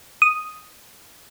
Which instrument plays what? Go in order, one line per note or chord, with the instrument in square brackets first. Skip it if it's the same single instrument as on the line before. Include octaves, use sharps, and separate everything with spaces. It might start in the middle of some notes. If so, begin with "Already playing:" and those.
[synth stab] D#6